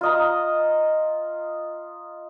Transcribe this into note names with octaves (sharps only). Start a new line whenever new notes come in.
F4 D#5 A#5